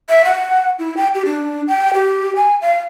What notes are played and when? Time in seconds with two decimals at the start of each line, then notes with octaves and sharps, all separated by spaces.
0.10 E5
0.25 F#5
0.79 E4
0.97 G5
1.14 G4
1.26 D4
1.68 G5
1.94 G4
2.36 G#5
2.62 F5